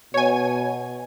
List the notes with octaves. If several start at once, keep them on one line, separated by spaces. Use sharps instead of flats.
B2 C#5 G#5